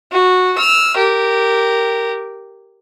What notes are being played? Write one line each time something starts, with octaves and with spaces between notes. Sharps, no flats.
F#4
E6 F6
G4 A#4